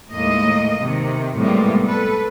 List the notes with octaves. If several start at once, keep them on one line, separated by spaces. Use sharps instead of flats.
D#2 A2 G#3 A#3 D#5
C3 D#3
A2 C3 G3 G#3 A#3 B3
A4 B4